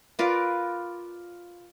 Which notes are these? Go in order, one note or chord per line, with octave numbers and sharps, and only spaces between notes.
F4 A#4 B4 D5